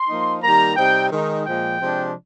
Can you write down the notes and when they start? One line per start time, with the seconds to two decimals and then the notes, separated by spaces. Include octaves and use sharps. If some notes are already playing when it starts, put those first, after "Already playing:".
Already playing: C6
0.09 F3 A#3 D#4
0.42 D#3 G3 A#3 A#5
0.76 C3 G3 C4 D#4 G5
1.11 D#3 G#3 D#4
1.45 A#2 F3 G#3 G5
1.79 C3 F3 G#3 D4